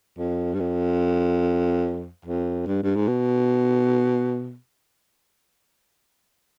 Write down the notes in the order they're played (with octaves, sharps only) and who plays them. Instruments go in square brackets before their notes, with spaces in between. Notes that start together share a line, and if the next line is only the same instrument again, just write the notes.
[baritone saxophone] F2
G2
F2
F2
G2
G2
G#2
B2